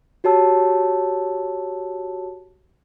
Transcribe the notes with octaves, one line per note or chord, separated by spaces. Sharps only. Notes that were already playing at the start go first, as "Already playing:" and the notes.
F#4 G4 C#5 A5 E6